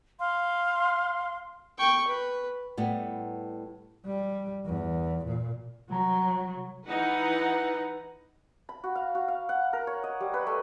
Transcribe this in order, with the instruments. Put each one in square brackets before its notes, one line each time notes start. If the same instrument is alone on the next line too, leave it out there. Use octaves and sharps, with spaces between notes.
[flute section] F5 C6
[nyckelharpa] G5 C#6
B4
[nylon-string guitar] A2 G3 B3
[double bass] G3
E2
A#2
[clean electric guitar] C2 A#5 [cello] F#3
[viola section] E3 D#4 B4 F#5
[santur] B5
F#4
F5
F#4
F5
F#5
A#4
C#5
D#5
G3
B4
A3